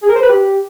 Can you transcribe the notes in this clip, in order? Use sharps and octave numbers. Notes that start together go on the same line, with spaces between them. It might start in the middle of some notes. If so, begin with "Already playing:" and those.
G#4
A#4
C5
B4
G4